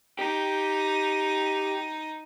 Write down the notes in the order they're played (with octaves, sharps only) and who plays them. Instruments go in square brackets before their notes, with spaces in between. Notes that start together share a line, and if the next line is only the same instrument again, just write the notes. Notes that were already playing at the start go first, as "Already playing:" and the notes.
[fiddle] D#4 [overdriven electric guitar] G4